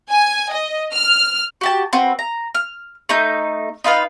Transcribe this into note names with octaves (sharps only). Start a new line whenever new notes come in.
G#5
D#5
F6
F#4 G4 A5
C4 F#4 B4
A#5
F6
A3 D#4 G6
D#4 F4 B4 F5